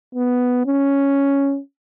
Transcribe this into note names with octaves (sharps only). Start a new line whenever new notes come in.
B3
C#4